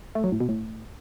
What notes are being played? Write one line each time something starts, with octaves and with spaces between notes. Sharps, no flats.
A3
F#3
A2
B2
A2